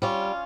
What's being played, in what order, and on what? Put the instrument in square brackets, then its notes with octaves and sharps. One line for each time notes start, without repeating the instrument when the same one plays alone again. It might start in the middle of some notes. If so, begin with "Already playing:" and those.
[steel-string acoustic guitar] G3 C#4 F4